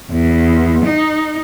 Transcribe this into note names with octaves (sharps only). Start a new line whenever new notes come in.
E2
D#4